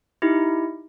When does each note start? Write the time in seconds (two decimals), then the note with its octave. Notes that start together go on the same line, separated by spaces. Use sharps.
0.22 D#4 E4 G4